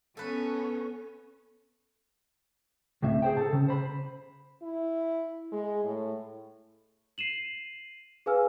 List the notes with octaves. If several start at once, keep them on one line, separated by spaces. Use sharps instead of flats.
B3 C#4 A4 B4
C#2 A2 C3 E5
G#4 C5 G5
A4 A5
C#3
C5 B5
E4
G#3
A2
C7 D#7 E7 F#7
G#4 B4 F5 G#5 E6 F6